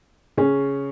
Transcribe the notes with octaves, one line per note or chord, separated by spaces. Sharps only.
C#3 C#4